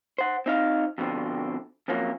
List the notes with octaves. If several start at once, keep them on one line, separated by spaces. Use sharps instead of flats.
C5 F#5
C4 D#4 F5
F2 B2 D3 C4
F2 F3 F#3 A#3 C#4